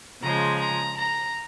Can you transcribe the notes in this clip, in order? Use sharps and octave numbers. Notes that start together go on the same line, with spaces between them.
C#3 F3 G#3 A#5
A#5
A#5